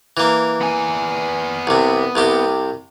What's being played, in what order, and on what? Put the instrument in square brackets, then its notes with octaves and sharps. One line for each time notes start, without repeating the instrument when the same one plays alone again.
[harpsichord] E3 A#3
[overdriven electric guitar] B3 G#5
[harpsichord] C2 C3
C2 C3 G4